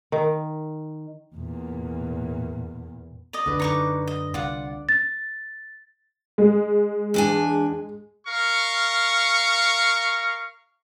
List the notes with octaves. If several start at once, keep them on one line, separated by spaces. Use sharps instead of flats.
D#3
E2 A#2
D5 D#5
C#2 F#2 D3 D4 B4
F#2 D#4 C#6 D6
D#5
C2 F4 D5 F#5
A6
G#3
E2 D4 G#5
A#4 F5 C#6